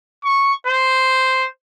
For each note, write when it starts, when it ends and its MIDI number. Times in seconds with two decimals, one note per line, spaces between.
0.25 0.53 85
0.67 1.47 72